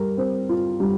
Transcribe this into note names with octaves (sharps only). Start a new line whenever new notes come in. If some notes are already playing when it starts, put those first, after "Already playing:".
Already playing: G3 A#4
C4
F4
G3